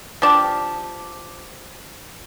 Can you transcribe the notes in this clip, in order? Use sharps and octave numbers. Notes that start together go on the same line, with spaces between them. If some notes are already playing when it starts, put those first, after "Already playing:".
F3 D4 G4